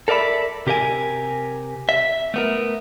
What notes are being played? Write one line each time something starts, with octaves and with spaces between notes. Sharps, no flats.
A4 A#4 D5 E5 B5
C3 G4 A#4 E5 G#5
E5
A3 B3 A#4